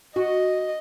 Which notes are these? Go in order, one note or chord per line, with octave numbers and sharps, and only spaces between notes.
F#4 D#5